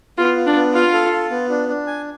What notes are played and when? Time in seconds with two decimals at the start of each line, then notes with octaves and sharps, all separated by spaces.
0.18 B3 F4
0.37 F4
0.47 D4
0.55 B3
0.74 F4 F5
0.93 A4
1.12 F4
1.30 B3
1.49 D4
1.68 D4
1.87 G#5